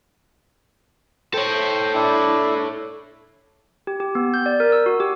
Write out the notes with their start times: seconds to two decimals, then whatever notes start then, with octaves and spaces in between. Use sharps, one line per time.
1.34 A4 C5 C#5 G5
1.94 D4 E4
3.87 G4
4.00 G4
4.15 B3
4.34 G6
4.46 D5
4.60 A#4
4.72 E6
4.86 F#4
5.00 G4